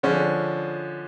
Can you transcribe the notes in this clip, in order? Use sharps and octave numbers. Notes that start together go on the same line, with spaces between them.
D3 F3 G#3 C#4